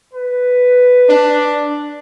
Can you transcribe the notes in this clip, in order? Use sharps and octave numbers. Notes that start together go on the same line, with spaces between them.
B4
D4